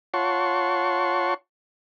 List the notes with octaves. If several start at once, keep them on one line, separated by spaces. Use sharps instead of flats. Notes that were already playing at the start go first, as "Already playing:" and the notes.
F4 C#5 F#5 A5 C6 C#6